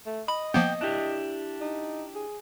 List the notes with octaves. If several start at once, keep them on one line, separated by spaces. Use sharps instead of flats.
A3
D#5 B5
F3 A#3 B3 G5
D4 E4 G4
D#4
G#4